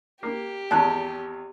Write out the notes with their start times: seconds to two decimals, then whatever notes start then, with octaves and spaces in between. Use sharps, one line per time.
0.23 A#3 G4
0.71 G#1 E2 A5 F#6